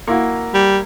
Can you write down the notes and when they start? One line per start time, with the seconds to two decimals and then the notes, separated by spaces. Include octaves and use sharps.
0.08 A#3 E4 F#4
0.54 G3